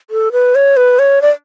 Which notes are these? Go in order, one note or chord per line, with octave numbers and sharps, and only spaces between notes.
A4
B4
C#5
B4
C#5
D5